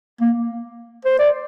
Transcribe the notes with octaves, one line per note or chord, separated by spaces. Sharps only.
A#3
C5
D5